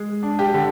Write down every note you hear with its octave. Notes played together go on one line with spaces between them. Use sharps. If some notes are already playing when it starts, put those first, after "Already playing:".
Already playing: G#3
D4
G4
D3